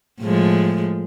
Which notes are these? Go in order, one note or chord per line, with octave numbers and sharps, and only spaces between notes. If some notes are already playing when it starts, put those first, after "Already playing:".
A2 F3 G#3